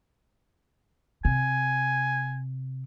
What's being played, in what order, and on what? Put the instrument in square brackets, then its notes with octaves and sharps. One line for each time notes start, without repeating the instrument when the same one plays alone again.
[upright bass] C3 [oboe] G#5